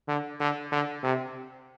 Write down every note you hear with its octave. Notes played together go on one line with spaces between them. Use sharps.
D3
D3
D3
C3